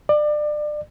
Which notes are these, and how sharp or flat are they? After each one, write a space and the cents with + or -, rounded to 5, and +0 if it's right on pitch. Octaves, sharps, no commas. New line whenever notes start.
D5 +30